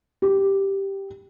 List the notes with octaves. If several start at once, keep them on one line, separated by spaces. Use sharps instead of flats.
G4